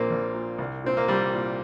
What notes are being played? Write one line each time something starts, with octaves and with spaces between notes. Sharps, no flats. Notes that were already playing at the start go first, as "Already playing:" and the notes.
Already playing: A#1 A#2 A#3 C4
A#1
A#2
C2
A#2 C4
A#3
C2 G3
A#2